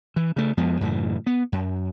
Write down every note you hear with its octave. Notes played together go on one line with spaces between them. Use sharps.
E3
C#3 A3
F2 F3 G#3 B3
F#2 A2 C#3 E3
B3
F#2